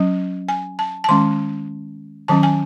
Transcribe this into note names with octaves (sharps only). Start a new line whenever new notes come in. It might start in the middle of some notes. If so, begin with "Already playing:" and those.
Already playing: F#3 C#4
G#5
A5
A5
D#3 G#3 C#4 C6
D#3 F#3 C#4 A5
G#5